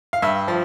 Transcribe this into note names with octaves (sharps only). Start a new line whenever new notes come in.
F5
G2 E5
F3